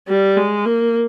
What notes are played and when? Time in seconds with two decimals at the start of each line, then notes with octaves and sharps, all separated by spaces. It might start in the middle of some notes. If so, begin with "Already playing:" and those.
0.08 G3
0.37 G#3
0.66 A#3